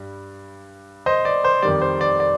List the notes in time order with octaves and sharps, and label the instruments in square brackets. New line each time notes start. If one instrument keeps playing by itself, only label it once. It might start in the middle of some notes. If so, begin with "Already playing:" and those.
Already playing: [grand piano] G2 G3
C5 D#5
D5
C5
F2 D#3 G3 D5
C5
D5
D5